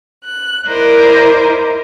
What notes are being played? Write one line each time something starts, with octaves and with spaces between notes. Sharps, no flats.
F#6
E4 A#4 C5 D5 D#5